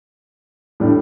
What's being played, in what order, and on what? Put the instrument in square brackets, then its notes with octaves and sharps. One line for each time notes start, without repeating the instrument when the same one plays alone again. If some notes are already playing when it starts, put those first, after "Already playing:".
[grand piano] A2 G3 D4